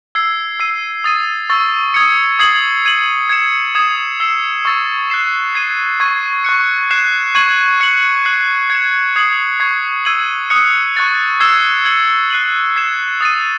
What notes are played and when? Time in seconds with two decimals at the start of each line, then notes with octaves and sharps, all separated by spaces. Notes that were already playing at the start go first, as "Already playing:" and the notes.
0.15 E6 G#6 C7
0.60 E6 C7 D#7
1.04 D#6 A6 D#7
1.50 C#6 E6 A6
1.94 D#6 G#6 C#7
2.39 D#6 G#6 C7 F#7
2.85 G#6 D#7 F#7
3.29 G#6 C#7 E7
3.75 D#6 G#6 C7 E7
4.20 E6 C7 E7
4.65 C#6 E6 A6
5.10 F#6 C7 E7
5.55 G#6 C7 D#7
6.00 C#6 G#6 C7 D#7
6.44 C#6 F#6 C#7
6.91 F#6 C7 E7
7.35 C#6 G#6 D#7 F#7
7.80 F#6 C#7 F#7
8.25 F#6 C7 F#7
8.70 G#6 C#7 E7
9.16 D#6 G#6 C7 F#7
9.60 C#6 G#6 C7
10.05 E6 G#6 D#7 F#7
10.50 D#6 F#6 C#7
10.95 C#6 F#6 A6 C#7
11.40 E6 G#6 C7 E7
11.85 G#6 C#7 F#7
12.30 F#6 C7 D#7 F#7
12.76 G#6 C7 E7
13.21 D#6 A6 D#7